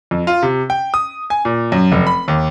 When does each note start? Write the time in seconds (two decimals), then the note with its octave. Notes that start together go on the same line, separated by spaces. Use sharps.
0.11 F2
0.27 F4
0.43 C3
0.70 G5
0.94 D#6
1.30 G#5
1.45 A#2
1.72 F#2
1.92 F1
2.07 B5
2.28 D#2